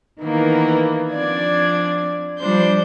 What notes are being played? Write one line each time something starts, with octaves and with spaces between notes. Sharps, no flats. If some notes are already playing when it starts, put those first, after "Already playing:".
D#3 E3 A#3 B3
F3 C4 D4 D5 G#6
F3 G3 D4 C5 G6